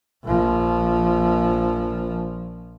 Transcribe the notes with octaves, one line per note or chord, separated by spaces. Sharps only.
A#1 F3